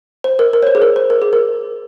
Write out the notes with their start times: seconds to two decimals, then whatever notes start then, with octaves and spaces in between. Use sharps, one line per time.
0.24 C5
0.39 A#4
0.53 A#4
0.63 C#5
0.67 C5
0.75 G#4
0.82 A#4
0.96 C5
1.10 A#4
1.22 G#4
1.33 A#4